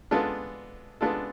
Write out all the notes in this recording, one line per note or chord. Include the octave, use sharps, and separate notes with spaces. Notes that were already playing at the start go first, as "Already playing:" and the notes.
G#3 B3 D4 F4 A4
G#3 B3 D4 F4 A4